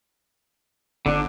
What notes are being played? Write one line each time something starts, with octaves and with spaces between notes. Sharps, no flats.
G1 D3 D4